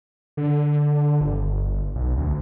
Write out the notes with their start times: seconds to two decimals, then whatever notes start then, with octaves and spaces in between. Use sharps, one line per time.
0.37 D3
1.21 G1
1.95 B1
2.17 D2